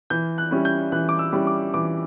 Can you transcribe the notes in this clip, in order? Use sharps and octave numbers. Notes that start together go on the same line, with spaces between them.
E3 G6
F#6
G3 C#4 E4
G6
E3 F#6
D6
E6
G3 C#4 E4
D6
E3 D6